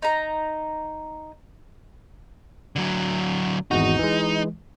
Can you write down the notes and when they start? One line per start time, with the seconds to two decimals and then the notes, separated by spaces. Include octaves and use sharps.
0.02 D#4 A#5
2.76 D3 F#3
3.71 G#1 E2 D#4 F#4
3.99 E3 G#3